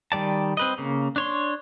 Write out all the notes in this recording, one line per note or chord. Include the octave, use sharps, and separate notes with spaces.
D#3 G3 D5 A5
C4 B4 D#5
C#3 A#3
D4 C#5 C6